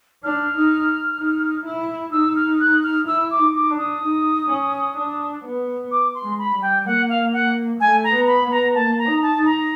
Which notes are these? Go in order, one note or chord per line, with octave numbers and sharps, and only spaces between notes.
D4 F6
D#4
D#4
E4
D#4 E6
F6
F#6
F6
E4 E6
D6
D#4
D6
D4
D#6
D#4
C#4
D4
B3
D6
C6
G#3
B5
G3
G5
A#3 F#5
F5
F#5
A3 G#5
A#5
B3
B5
B3
A#5
A#3 A5
A#5
D#4
A5
D#4
A#5